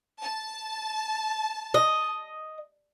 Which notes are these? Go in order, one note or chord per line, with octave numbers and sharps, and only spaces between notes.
A5
D#5